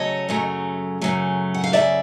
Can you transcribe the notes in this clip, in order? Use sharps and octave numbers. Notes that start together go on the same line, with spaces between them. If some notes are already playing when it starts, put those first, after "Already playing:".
Already playing: C#3 F#3 A3 C#5 D#5
F#2 C#3 F#3 A3
F#2 C#3 F#3 A3
F#5
F5
F#2 C#3 F#3 A3 D5 E5